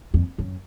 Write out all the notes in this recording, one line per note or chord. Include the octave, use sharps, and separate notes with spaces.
F2
F#2